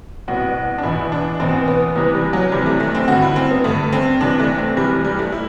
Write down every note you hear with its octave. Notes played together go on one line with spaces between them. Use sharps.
C2 B2 F#4
D4
E2 B2 E4
D4
E2 B2 C4
B3
C2 C3 E3 B3
G3
F#3
C2 C3 E3 G3
A3
A3
C4
G2 D3 F#4
E4
C4
B3
G2 D3 A3
C4
C2 C3 E3 D4
A3
C4
C2 C3 E3 G3
G3
G3
A3
E4